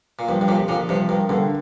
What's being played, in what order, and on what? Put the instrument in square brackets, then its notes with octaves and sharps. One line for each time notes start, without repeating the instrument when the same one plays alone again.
[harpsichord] A#2
[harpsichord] G2 [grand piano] F3
[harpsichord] G2
[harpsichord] F2 A#2 [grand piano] G4
[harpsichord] A#2 D3 [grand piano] F3
[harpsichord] G2 C3 [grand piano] F3
[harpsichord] G2 [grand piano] A#4
[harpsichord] G2 [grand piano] D3